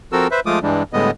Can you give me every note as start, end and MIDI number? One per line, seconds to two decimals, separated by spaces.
0.12 0.27 53
0.12 0.27 60
0.12 0.27 66
0.12 0.27 69
0.12 0.27 70
0.12 0.27 88
0.31 0.40 71
0.31 0.40 72
0.31 0.40 76
0.46 0.59 53
0.46 0.59 56
0.46 0.59 57
0.46 0.59 65
0.46 0.59 86
0.46 0.59 87
0.63 0.83 43
0.63 0.83 52
0.63 0.83 55
0.63 0.83 56
0.63 0.83 62
0.93 1.11 45
0.93 1.11 50
0.93 1.11 55
0.93 1.11 56
0.93 1.11 59
0.93 1.11 75